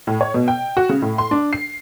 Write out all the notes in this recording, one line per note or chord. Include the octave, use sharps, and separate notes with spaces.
A2
C#5
B2
G5
F#4
C#3
A2
C6
D4
C7